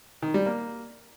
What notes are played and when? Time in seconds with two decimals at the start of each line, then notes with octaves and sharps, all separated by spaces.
0.22 D#3
0.34 G3
0.46 A#3